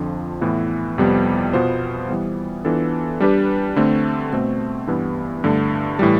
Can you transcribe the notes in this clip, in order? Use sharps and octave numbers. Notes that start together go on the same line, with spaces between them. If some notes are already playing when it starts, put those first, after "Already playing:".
Already playing: F2 D3 F3
A2 E3 B3 E4
F2 C3 G3 B3
B2 B3 F4 C5
E3 G3 B3
E3 B3 D4 F4 A4
G3 D4 G4 B4
D3 A3 C4
B2 A3 C4
G2 E3 B3 E4 G4
G2 D3 A3
A2 E3 G3